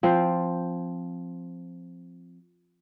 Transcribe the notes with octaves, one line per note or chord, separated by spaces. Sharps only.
F3 C4